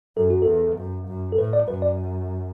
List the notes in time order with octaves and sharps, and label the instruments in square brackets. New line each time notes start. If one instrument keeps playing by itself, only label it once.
[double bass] F#2 [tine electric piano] A4
[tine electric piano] F#4
[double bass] E2 [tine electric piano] A4
[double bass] F#2
F#2
[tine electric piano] A4
[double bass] A2 [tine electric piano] B4
[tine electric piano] D5
[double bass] F#2 [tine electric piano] B4
[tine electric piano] D5